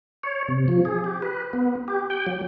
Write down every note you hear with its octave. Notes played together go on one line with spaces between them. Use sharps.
C#5
C3
F3
G#4
G4
B4
B3
G4
G5
F#3